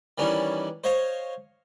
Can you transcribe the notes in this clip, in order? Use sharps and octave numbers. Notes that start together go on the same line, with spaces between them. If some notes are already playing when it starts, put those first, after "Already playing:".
D#3 E3 G3 C#4 D4
C5 C#5 D#5 F5